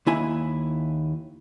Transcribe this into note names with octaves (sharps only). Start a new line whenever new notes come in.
D#2 E4 G#5